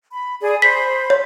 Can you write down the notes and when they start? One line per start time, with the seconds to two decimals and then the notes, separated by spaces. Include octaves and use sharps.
0.12 B5
0.41 G#4 D5
0.62 C5 B5 B6
1.10 C#5